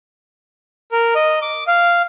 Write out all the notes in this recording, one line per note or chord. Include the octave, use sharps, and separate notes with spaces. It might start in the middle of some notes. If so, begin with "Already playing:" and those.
A#4
D#5
D6
F5